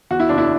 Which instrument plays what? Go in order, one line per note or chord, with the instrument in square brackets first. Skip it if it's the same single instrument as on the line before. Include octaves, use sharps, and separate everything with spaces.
[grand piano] E2 F#4
E4
F#1 D4
E4